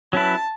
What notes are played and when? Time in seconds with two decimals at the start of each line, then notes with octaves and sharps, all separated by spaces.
0.13 F#3 C#4 E4 B4 A5